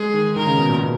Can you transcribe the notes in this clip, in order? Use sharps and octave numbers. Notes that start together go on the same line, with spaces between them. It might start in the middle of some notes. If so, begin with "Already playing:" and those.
Already playing: G#3 G#4
D#3
D#3 A#4
C#3
B2
A#2
B2